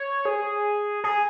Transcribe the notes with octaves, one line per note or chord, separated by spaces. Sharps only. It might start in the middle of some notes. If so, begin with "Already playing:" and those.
Already playing: C#5
G#4
G#4